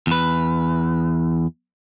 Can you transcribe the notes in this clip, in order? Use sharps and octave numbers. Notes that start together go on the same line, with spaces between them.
E2 B4